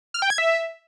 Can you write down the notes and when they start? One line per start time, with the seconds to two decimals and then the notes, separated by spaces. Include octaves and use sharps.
0.14 F6
0.22 G5
0.30 G#6
0.38 E5